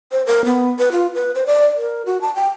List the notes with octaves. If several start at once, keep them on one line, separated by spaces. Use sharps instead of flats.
C5
A#4
B3
B4
F4
B4
C5
D5
A#4
F#4
A5
G5